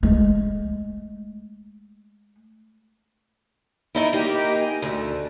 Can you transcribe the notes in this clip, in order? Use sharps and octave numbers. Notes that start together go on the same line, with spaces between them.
G#3 A3
D#3 D#4 E4
A#3 D#4 G4
G#5
D2 A4